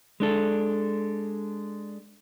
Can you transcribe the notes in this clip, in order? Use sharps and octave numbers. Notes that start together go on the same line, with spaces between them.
G#3 D4 A4